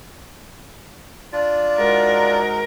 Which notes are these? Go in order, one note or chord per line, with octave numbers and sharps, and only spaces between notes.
D4 F4 D5
G#2 G#3 F#4 A#4